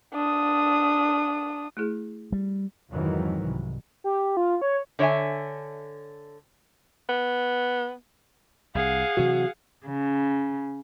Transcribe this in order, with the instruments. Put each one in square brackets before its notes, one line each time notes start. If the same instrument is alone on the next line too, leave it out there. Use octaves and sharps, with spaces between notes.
[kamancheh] D4 D#6
[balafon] A3 E4 G#4
[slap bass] G3
[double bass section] F2 G#2 D#3 E3 F#3
C2
[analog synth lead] G4
F4
C#5
[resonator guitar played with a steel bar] D3 C#5 D5 E5 G#5
[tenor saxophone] B3
[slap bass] C2 [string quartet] G#4 F5 F#5
[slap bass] C3 E3 F#3 [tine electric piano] F#4
[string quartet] C#3